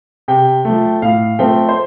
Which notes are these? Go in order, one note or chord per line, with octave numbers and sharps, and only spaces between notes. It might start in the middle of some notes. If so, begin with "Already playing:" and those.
C3 G5
F3 A3
A2 F5
F3 A3 C4 G5
C5